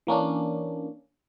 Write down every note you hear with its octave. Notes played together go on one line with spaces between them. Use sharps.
E3 A#3 C#4 D4